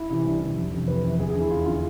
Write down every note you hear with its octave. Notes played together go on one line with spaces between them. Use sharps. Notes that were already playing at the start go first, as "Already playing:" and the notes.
Already playing: E4
C3 E3 E4
C2 D4
C3 E3
F2
C3 E3
F2 B4
C3 E3
E2 G#4
G#4
D3
E4
E2 F4
D3 F4